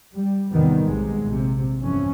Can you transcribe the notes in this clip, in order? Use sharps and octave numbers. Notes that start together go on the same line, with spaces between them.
G3
E2 A2 C3 D#3 G3 B3
B1 C3 G#3
A#1 C3
G1 F2 A#2 E3 C#4